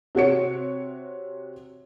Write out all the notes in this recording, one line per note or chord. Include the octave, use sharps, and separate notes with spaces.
C3 F#4 C#5 C#7